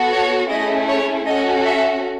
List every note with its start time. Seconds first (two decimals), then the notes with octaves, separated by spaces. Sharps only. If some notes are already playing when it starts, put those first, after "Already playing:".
Already playing: B3 F#4 A4
0.12 C#5
0.50 A3 C#4 E4 G#4 D#5
0.88 C#5
1.26 C#4 F#4 A4 D#5
1.65 E5